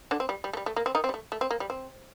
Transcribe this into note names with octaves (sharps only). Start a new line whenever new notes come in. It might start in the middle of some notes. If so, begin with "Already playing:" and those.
D3 D4
C4
G3
G3
A3
G3
A3
A#3
C4
D#3 D#4
C4
G3
A3
A3
C4
A#3
G3
C4